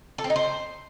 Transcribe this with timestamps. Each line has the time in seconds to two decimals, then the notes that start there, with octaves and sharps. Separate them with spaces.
0.18 A4
0.24 C4
0.30 D#4
0.36 C5